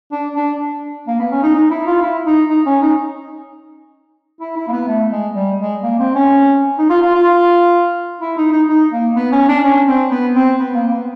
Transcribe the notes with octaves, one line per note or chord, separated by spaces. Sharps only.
D4
D4
A#3
B3
C#4
D#4
D#4
E4
F4
E4
D#4
D#4
C#4
D#4
E4
E4
A#3
B3
A3
G#3
G3
G#3
A#3
C4
C#4
D#4
F4
F4
F4
E4
D#4
D#4
D#4
A#3
B3
C#4
D4
C#4
C4
B3
C4
B3
A#3
B3